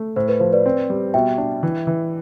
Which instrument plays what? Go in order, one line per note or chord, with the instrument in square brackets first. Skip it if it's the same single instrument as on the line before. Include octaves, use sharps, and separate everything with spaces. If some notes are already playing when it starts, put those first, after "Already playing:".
Already playing: [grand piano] A3
[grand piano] A2 [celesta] C5
[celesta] B4
[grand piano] F3 [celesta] C5
[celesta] B4 D5
[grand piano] C4
G3
[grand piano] B2 [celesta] E5 G5
[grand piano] D4
E3
E3